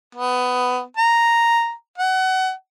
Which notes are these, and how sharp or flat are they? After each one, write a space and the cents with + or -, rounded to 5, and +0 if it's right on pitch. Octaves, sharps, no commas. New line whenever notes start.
B3 +15
A#5 +0
F#5 +25